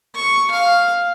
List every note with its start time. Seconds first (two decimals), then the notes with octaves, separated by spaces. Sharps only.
0.15 C#6
0.51 F5